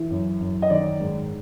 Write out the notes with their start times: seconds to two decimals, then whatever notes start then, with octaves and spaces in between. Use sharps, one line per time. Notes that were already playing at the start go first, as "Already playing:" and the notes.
Already playing: E3
0.10 F#2
0.41 F#2
0.62 D#5
0.70 D#3 D5
1.00 G#2